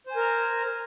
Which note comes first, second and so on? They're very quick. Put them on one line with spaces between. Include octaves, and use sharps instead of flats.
C5 G#5 A#4 A#5